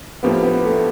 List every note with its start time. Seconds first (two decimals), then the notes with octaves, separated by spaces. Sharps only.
0.23 A2 F3 A#3 B3 D4 G4
0.43 B3
0.64 A3